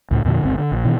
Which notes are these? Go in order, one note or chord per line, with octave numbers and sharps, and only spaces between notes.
C#2 A2
E2 A#2 D3 F3
G1 C#2 C4
D3
A#1
B2 D#3 E3